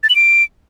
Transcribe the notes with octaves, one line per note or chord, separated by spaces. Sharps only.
A6
F#7
D7